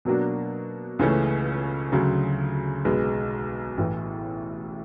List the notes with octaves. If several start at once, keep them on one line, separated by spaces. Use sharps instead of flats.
B2 F#3 A#3 D4 F#4
C#2 C#3 E3 A3 C#4
D2 C#3 F#3
B1 B2 G#3 B3
A1 A2 E3